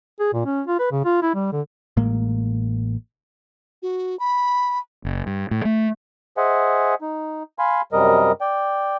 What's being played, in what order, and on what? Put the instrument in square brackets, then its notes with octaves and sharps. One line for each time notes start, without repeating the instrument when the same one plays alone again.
[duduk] G#4
A#2
C#4
F4
B4
C#3
F4
E4
G3
D3
[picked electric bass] A1 A2 G#3 A#3
[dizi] F#4
B5
[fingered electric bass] F#1
G2
A2
A3
[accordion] G#4 C5 D#5 E5 F#5 G#5
D#4
F5 G#5 B5 C6
F#2 C3 G3 A#4 D#5
D5 G5